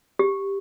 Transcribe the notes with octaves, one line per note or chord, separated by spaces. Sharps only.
G4